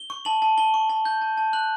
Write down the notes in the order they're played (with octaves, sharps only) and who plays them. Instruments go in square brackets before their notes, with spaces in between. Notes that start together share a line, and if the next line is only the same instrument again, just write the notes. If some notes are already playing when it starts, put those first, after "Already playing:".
Already playing: [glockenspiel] G7
C#6
A5 F#7
A5
A5 G7
C#6
A5
G6
A5
A5
F#6 F#7